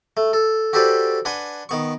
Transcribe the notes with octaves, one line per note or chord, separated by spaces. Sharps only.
A3
A4
F#4 G4 A4 B4 C5 D5
D4 B4 F#5 G#5 C6
D#3 B3 C#6